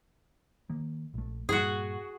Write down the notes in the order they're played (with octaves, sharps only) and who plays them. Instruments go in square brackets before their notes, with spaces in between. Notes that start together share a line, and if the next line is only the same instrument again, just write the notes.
[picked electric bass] D#3 A#3
A#1 A3
[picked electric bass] G2 A#2 G3 [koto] F#4 G#4